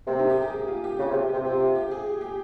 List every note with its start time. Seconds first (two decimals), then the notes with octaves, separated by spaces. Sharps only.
0.07 C3 A#3
0.19 D#4
0.30 G4
0.41 G#4
0.53 G4
0.68 F4
0.84 G4
0.99 C#3 F4
1.10 C3
1.15 G4
1.29 C3 G4
1.45 C3 F4
1.60 F4
1.75 G4
1.91 G#4
2.06 G4
2.21 G4